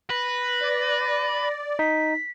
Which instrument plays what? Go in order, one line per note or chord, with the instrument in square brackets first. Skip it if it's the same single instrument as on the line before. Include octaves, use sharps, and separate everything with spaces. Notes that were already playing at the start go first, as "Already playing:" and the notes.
[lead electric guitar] B4 [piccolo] A#6
[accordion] D5
[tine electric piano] D#4 [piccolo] B6